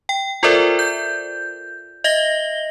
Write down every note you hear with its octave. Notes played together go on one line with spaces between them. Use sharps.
G5
F4 A4 A#4 C5 D5 E5
G6
D#5 E5 A#6 G7